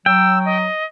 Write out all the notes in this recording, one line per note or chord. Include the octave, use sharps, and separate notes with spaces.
F#3 G5 E6
D#5